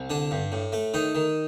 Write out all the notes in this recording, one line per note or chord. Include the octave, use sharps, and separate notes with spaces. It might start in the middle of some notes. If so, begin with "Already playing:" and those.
Already playing: C2
D3 D4
G2
A2
A3
D#3 D#4
D#3